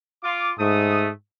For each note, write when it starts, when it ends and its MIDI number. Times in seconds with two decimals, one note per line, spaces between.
0.24 0.51 65
0.24 0.51 86
0.59 1.12 44
0.59 1.07 57
0.59 1.07 87